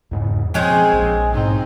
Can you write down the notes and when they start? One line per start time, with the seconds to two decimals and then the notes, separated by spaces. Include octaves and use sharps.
0.11 E2 G#2 C#3
0.54 C#3 F3 G#3 C4 G#4
0.93 A#1
1.33 G#2 B2 C4 D#4